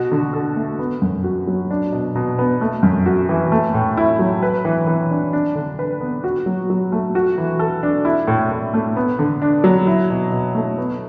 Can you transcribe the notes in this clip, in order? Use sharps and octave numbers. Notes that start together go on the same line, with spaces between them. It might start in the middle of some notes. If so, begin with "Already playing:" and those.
Already playing: B2 F#4
D3
A4
A3
B3
F#2
F#4
F#3
D4
B2
B2
B3
A3
F#2
F#4
E3
A3
A2
E4
F#3
B4
E3
E3
D4
D4
D3
B4
B3
F#4
F#3
F#3
A3
F#4
E3
A4
D4
E4
A2
A2
A3
B3
D3
D4
F#3
E4
B2
B2
A3
B3